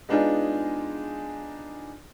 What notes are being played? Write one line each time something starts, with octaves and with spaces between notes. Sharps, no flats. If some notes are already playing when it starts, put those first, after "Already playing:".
G#3 B3 D4 D#4 F4 G#4